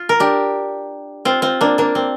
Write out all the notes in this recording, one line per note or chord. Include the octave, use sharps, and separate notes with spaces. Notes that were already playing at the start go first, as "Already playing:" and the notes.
Already playing: F4
A#4
D4 G4
C4 F4
C4 F4
A#3 D4
A#3 D4
C4